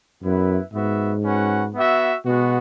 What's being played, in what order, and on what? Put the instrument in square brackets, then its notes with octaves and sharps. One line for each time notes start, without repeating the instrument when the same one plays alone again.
[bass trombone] F#2 [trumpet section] B3 E4 B4 E5
[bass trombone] G#2 [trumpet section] B3 F#4 B4 E5
[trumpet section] C#4 F#4 B4 F#5
B3 F#4 E5
[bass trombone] B2 [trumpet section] G#3 B3 F#4